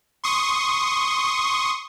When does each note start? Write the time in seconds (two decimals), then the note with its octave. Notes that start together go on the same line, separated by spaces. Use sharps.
0.24 C6 C#6 D#6